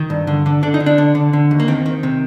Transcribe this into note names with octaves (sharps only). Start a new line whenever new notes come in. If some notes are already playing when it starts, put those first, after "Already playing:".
Already playing: D#3
G2
D3
D3
D3 D4
D#4
D3
D4
D3
D3
D3
D#2
A#3
D#3 C4
D#3
C3